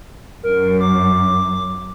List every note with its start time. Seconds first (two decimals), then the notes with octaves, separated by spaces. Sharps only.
0.43 F#2 A#4
0.81 D6